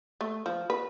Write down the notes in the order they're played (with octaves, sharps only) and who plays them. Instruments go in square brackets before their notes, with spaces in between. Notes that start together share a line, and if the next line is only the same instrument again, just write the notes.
[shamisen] A3
F3
B4